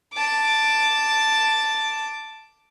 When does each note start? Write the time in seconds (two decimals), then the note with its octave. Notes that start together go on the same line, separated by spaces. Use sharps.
0.13 A5 D6